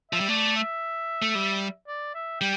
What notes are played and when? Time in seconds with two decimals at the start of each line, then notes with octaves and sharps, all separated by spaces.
0.11 F3 E5
0.20 G3
0.29 A3 D5
0.55 E5
1.22 A3
1.35 G3
1.88 D5
2.15 E5
2.40 G3 G5